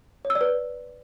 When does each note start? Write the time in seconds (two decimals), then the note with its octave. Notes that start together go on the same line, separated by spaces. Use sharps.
0.25 C#5
0.30 E6
0.35 D5
0.41 B4